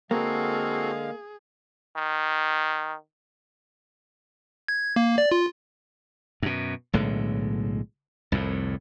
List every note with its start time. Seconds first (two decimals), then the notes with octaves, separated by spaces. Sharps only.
0.11 D3 G#3 A#3 C4 F#4 G#4 A4 F5
1.96 D#3
4.68 G#6
4.96 A#3
5.18 D5
5.32 F4
6.42 F#2 B2
6.93 B1 A2 D3 G#3
8.32 C2 F2 A2